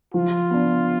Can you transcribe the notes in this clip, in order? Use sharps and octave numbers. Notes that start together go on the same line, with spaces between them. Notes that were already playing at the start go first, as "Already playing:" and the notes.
F3 F4
B3 D4